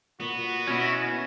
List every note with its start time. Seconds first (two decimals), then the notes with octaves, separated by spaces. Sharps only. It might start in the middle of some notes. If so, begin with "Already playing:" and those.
0.20 A#2 B3 F#4
0.37 A#2
0.67 B2 C#4 E4